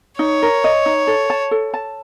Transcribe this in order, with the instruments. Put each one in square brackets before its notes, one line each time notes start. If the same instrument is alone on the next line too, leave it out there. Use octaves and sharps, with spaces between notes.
[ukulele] D#4 [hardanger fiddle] C#5
[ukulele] A#4
D#5
D#4
A4
A5
A4
A5